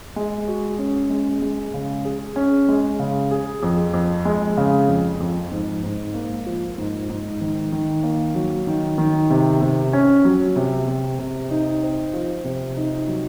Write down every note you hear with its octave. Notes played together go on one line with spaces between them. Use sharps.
G#3
F#4
C#4
G#3
G#3
C#3
G#4
C#4
G#3
C#3
G#4
F2
F2
G#3
C#3
F2
F2
G#2
G#2
A#3
F3
G#2
G#2
D#3
D#3
A#3
F#3
D#3
D#3
C3
C3
C#4
F#3
C3
C3
C3
D#4
C4
F3
C3
D#4
F#3